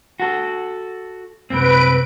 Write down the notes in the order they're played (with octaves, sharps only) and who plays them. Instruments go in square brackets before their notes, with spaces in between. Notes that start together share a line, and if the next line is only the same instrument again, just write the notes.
[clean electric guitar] F#4 A4
[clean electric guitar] C2 F#2 C4 [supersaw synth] B4 D7